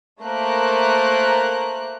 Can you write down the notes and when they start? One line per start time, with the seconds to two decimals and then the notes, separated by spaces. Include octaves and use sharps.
0.21 A3 A#3 A#4 C5 F#6